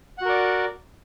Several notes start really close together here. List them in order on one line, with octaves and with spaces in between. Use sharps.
F#5 F#4 A#4 D5